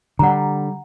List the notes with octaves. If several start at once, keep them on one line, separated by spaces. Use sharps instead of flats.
D3 G3 F#5 A#5